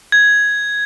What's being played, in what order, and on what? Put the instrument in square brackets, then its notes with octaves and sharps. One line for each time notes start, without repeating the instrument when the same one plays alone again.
[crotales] G#6